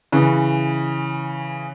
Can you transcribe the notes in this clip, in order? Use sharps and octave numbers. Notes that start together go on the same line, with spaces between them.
C#3 E3